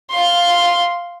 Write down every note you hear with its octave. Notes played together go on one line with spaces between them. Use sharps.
F5 C6